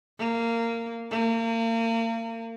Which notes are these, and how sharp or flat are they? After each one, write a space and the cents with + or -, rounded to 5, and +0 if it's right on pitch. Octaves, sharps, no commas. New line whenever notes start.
A#3 -15
A#3 -35